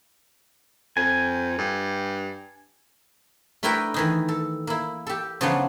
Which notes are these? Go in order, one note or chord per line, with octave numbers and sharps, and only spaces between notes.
F2 G#5
G2
A3 D4 E4 A#4 B4 G5
D#3 E3 D#4
A4
A#3 E4
G4 A4
C#3 F3 F#3 B3 D4 F4